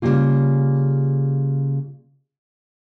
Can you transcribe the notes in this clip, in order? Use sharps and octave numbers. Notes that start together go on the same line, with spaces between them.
C#3 G3 A3 A#3 F4